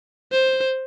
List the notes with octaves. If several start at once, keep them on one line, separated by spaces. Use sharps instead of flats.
C5